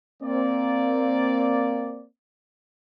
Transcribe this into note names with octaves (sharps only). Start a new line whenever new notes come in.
A#3 C4 D5